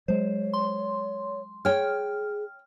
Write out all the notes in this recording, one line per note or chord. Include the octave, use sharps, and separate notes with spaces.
F#3 G#3 C5 C#5
C6
G#4 C#5 G5 F6